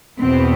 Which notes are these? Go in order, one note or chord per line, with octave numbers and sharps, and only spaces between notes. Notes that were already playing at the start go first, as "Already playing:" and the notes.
E2 B2 B3 C4